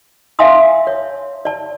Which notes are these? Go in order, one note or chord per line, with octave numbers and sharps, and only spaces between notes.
E5 F5 G#5 A5 C6 D#6
C#5
D5 A5